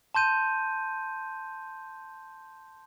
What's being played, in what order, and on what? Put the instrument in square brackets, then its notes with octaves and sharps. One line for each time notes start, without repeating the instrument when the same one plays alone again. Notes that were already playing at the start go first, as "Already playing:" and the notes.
[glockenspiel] A5 C6 G6 D#7